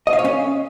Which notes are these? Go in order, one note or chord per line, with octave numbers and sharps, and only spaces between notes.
D#5
F5
C#5
C#4